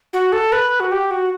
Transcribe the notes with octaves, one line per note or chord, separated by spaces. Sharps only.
F#4
A4
B4
F#4
G4
F#4